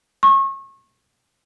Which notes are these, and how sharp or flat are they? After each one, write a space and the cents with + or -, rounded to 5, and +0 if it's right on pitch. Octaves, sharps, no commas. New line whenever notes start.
C#6 -30